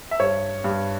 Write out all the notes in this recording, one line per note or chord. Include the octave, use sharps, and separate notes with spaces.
E5
G2 C#5
G2